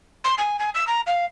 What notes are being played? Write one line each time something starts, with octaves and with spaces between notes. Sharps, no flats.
C6
G#5
G#5
E6
A#5
F5